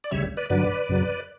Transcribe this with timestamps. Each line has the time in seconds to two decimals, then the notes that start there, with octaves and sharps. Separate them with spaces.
0.04 D5
0.11 D2 C#3 G3 C#5 E5
0.37 B4 D5
0.50 G2 D3 F#3 B4 D5
0.89 F#2 C#3 F#3